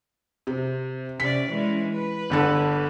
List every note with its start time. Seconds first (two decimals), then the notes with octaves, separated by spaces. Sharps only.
0.47 C3
1.20 C3 C#4 D5 B6
1.50 E3 G#3 C#4
1.91 B4
2.30 G1 D3 A4